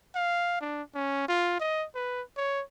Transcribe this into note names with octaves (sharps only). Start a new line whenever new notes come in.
F5
D4
C#4
F4
D#5
B4
C#5